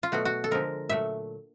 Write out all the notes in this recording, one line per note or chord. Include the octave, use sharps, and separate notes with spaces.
F4
B2 F#3 A3 F#4
F#4
A4
D3 F3 G#3 A#4
A#2 F#3 A3 E5